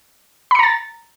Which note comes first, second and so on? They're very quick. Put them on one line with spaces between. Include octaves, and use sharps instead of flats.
B5 C#7 A#5 A6